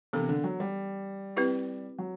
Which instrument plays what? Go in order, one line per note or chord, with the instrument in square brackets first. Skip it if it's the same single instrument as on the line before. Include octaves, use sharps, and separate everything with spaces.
[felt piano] C3 [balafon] E3 B3 D4 A4
[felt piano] D3
F#3
G3
[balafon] C4 E4 G4 B4
[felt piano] F#3